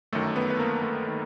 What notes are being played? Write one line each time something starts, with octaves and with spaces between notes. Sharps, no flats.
G1 F#2 D#3 A3 A4
B3 B4
B4
A#3 A#4
A3 A4
D#3